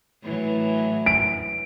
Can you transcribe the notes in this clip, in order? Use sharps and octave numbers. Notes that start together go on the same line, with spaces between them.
A2 E3 F#3
D7